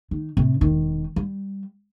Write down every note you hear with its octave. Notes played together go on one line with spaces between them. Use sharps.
D#3
A2 C3
E1 D#3
G3